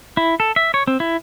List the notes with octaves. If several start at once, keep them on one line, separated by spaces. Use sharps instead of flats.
E4
A4
E5
C#5
C4
E4